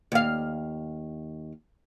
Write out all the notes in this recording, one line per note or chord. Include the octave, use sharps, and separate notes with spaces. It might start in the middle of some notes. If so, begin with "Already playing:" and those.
D#2 F5